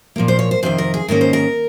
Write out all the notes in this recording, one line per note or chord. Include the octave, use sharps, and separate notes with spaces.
A#2 F3 A#3
C5
C#5
C5
F2 C3 D#3 C5
A#4
G#4
G#2 D#3 A#3 C#4 A#4
C5
A#4